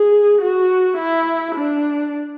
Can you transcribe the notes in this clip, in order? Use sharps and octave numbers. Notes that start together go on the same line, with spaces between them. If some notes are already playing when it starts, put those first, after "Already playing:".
Already playing: G#4
F#4
E4
D4